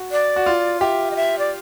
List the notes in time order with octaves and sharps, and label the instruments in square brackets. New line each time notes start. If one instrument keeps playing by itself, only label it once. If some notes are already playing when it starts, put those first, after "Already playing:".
Already playing: [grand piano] F#4
[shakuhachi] D5
[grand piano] F#4
F4
[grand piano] G4 [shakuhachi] E5
[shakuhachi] D#5
E5
D5